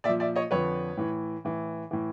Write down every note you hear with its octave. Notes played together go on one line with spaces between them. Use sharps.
A#2 D5 E5
F3
D5 E5
C#5 D#5
F2 D3 F3 B4 C#5
A2 E3
A2 E3
A2 E3